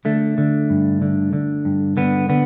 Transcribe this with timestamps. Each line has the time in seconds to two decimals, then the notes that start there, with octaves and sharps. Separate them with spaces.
0.05 D3 A3
0.38 D3
0.70 G2
1.02 D3
1.33 D3
1.65 G2
1.97 D3 B3
2.29 D3 B3